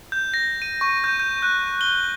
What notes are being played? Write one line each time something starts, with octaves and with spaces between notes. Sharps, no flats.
G6
A#6
D#7
C#6
G6
G6
F#6
G7